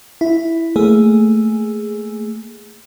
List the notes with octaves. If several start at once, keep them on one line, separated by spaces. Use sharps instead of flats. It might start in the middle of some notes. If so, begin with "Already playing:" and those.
E4
A3 A#3 G#4